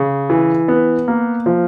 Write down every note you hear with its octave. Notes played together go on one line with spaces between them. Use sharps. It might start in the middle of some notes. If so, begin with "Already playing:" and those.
Already playing: C#3
E3
B3
A#3
F3